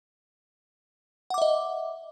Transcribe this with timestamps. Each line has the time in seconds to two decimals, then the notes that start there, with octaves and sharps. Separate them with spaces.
1.30 F#5
1.34 D6
1.38 E5
1.42 D#5